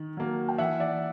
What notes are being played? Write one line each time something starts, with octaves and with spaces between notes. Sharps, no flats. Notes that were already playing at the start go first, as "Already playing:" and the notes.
Already playing: D#3
F#3 A#3
G5
E3 E5 F#5
D5 E5